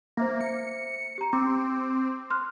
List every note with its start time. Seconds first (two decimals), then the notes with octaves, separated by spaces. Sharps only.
0.17 A#3 C5 E5 A#6
0.41 C#7
1.18 G4 A#5
1.33 C4 D6
2.30 C6 F6 F#6